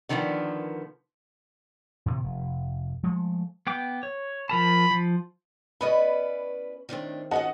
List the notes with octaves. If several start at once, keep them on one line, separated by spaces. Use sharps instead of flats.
D3 D#3 F3 A#3 B3
A2 C3 D#3 A#3
F1
F3 G#3 A3
B3 G5 D6
C#5
F3 A#4 A5 B5
F3
B3 C#4 E4 B4 D5 D#5 B5
A2 D#3 A3 C4 D4
C#4 F4 C#5 D#5 F#5 A5